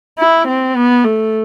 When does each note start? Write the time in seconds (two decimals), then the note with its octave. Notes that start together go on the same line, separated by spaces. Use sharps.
0.18 E4
0.48 C4
0.76 B3
1.04 A3